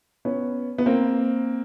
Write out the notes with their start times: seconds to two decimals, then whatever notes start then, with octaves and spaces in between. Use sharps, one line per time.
0.25 B3 C#4
0.78 B3
0.86 A#3 C4